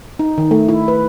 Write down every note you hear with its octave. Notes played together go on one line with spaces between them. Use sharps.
D#4
D#3
A3
E4
B4